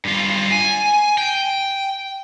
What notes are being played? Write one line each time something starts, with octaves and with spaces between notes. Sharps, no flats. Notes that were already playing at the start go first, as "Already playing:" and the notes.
G2 F4
G#5
G5